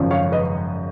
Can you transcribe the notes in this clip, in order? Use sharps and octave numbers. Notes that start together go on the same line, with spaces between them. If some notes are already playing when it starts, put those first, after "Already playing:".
Already playing: G#1 F#2 C#3 F3
C#5 F5
B4 D#5